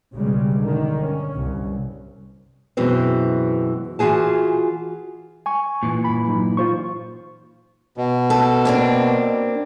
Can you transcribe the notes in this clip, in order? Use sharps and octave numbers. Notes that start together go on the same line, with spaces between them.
B1 G2 C#3 G3 G#3
D3 D#3
C#4
C2
F#2 B2 E3 G#3 C4
E3 F4 F#4 G#4 A5
G#5 C#6
A#2 E3
G2 B5
F#3 D#4
F4 C5 C#6
B2
A4
A#3 C4 D4